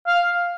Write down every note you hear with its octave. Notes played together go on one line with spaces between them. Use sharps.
F5